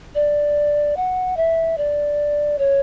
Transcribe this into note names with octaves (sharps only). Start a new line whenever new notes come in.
D5
F#5
E5
D5
C#5